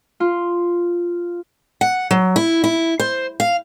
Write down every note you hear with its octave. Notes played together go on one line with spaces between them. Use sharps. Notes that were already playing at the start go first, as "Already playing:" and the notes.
F4
F#5
F#3
E4
E4
C5
F5